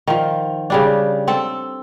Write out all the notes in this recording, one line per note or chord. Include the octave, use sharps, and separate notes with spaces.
D#3 F3
C#3 G3 D4
C4 A4